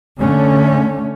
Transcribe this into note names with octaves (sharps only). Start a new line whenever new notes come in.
D3 A3 C#4